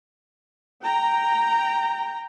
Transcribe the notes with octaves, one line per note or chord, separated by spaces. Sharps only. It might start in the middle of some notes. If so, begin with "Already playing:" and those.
G5 A#5